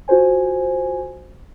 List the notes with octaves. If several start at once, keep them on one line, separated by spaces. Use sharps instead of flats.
F4 F#4 A4 C5 G#5